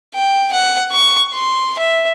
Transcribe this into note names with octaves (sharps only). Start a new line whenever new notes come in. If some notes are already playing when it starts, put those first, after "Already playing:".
G5
F#5
C#6
C6
E5